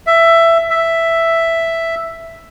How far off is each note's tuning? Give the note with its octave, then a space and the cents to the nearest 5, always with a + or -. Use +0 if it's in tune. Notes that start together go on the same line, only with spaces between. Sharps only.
E5 +15
E5 +5